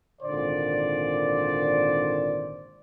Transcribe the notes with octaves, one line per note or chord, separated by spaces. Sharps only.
G#1 A#2 D3 C5 D5